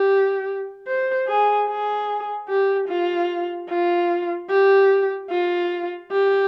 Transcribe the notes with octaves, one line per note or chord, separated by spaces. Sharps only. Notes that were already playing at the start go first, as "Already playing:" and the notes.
Already playing: G4
C5
G#4
G#4
G4
F4
F4
G4
F4
G4